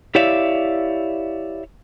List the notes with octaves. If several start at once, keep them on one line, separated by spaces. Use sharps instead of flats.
E4 G4 C#5 D5 E5 F5